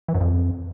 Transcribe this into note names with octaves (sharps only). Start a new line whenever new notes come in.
E3
F#2
F2